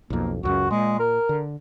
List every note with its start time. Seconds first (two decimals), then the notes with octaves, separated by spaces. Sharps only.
0.10 B1 F2 A#3
0.43 C#2 F#2 C#3 F#4
0.71 A#2 G#3
0.99 A#4
1.29 D3